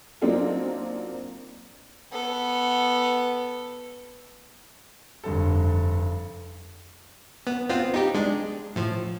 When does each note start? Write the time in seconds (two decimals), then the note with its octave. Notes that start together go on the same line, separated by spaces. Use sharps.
0.22 F#3 A#3 C4 D4 D#4 F4
2.12 B3 A4
5.24 F1 G2 D3 A4
7.47 B3
7.69 B3 C4 F4
7.94 D#4 G4
8.15 G#3 D4
8.76 A2 F3